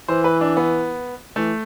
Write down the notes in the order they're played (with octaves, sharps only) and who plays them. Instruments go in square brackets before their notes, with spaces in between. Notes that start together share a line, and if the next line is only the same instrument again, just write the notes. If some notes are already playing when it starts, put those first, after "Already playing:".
[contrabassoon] E3 [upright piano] C5
[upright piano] B4
D4
B3
[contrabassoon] E3 [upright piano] A3